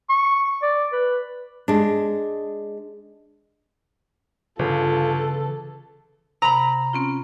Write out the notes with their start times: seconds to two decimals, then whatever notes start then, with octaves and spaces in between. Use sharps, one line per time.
0.09 C#6
0.62 D5
0.92 B4
1.68 G#3 D4
4.59 G1 C#3 E3 F4 A4
6.42 C3 A#5 B5
6.93 C4 C#4 F4